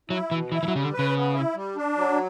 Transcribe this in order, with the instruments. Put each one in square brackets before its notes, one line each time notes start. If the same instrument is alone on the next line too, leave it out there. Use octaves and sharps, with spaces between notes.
[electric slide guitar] F#3 [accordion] E4
[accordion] B2 [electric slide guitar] E3
[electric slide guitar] E3 [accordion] E4
[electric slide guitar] E3
F#3
[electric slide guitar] C#3 [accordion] G3
[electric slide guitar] D3
[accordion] B4
[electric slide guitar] C#3
[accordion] B3
E4
G3
D4
F#3